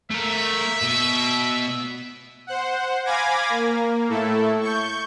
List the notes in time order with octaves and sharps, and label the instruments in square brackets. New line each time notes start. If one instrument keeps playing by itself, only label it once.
[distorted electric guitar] A3 A#4 [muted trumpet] E5
[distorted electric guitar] B2
[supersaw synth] C5 F#5
F5 G#5 B5 D6 G#6 A#6
A#3
A2 A3 E4 A4
C#6 G6